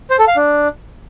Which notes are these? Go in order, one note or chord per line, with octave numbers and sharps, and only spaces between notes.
C5
A4
F5
D4